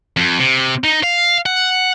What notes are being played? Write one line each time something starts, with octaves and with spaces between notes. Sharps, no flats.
F2
C3
D#4
F5
F#5